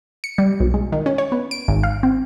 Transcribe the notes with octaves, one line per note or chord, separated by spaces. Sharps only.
C#7
G3
B1
G#3
D#3
C#4
C#5
B3
D7
G#1
F5
C4